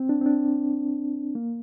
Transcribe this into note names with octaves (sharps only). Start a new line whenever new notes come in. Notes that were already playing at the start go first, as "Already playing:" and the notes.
Already playing: C4
D4
C4
D4
A#3